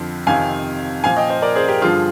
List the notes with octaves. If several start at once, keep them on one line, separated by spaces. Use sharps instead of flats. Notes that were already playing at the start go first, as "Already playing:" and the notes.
Already playing: F2 D3 F3
F2 C3 D#3 F5 G#5
A#2 F3 F5 G#5
D#5 G5
C5 D#5
A#4 D5
G#4 C5
G4 A#4
G2 D3 F3 F4 G#4